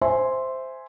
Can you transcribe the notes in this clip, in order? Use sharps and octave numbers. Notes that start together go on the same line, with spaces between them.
C5 E5 G#5 C6